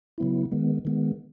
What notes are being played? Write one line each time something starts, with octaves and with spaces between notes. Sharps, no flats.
C#3 F#3 B3 E4
D#3 G#3 B3
D#3 G#3 B3